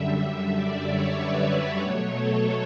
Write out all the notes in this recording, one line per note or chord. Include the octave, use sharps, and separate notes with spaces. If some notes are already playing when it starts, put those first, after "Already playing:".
Already playing: F#2 D3 G3 E5
D5
C#5
B4
B4
B2 F#3 A3 C#5
A4